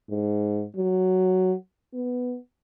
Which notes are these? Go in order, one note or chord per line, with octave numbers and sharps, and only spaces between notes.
G#2
F#3
B3